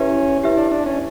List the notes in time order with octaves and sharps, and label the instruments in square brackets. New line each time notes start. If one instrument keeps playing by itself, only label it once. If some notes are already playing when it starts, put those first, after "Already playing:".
Already playing: [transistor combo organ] C#4 [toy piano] E4 G4 B4 E5
[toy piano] E4 G4 B4 E5
[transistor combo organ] D4
D4
C#4